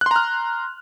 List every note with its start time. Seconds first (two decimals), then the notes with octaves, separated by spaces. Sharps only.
0.01 F#6
0.06 C6
0.11 A#5
0.16 F6